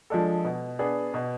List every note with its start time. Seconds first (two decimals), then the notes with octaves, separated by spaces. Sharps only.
0.10 F3 G#3 D4 A4
0.45 B2
0.79 B3 D4 G#4
1.14 B2